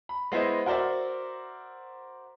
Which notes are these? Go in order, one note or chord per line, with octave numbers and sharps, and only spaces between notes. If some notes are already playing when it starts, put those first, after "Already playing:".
B5
G#3 B3 E4 C5 D#5
F#4 A#4 C5 D5 E5